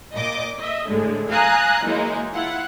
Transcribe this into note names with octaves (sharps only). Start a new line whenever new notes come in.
A#2 D#5 D6
D#5 E5
A2 D3 G#3
F5 G#5 A#5 D#6 F#6
E3 F#3 G#3 A#3 D#4
E4 F4 F#5